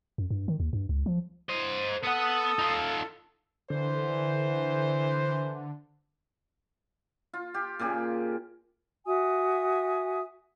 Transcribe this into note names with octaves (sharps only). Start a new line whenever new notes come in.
F#2
G2
D#3
D#2
G2
C#2
F3
C5 D#5
B3 A4 F#5 D#6
D#4 F4
D3 E3 C5
F4
G4
A#2 C#3 G4 G#4
F#4 E5 G#5 D#6